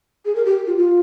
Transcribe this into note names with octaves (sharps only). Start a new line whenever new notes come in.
G#4
A#4
G4
F4
F4